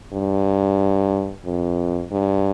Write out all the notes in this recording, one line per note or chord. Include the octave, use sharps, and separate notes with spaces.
G2
F2
G2